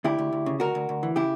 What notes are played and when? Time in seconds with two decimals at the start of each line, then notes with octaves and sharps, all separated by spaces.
0.04 D2 E4 G4
0.19 D2
0.32 D2
0.46 C#3
0.60 D2 F#4 A#4
0.75 D2
0.89 D2
1.03 E3
1.16 C#3 E4 G4